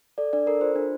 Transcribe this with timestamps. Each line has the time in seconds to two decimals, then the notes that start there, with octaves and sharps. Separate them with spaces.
0.18 A4 D5
0.33 D4 D5
0.47 A4 A#4
0.61 F4 C5
0.76 D4